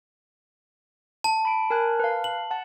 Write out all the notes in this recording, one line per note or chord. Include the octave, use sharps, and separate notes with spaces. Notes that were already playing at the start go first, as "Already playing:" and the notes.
A5
B5 D7
A#4 G#5 F#6
B4 F5
F#7
F#5 A5